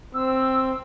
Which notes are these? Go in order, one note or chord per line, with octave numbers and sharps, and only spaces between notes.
C4 E6